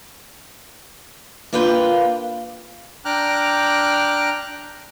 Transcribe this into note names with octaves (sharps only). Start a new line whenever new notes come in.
A#3 D4 F4 B4 G5
D4 G5 A#5 D6 F6 F#6